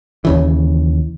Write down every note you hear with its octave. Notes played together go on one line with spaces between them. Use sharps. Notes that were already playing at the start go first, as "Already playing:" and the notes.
D#2 C#3 E3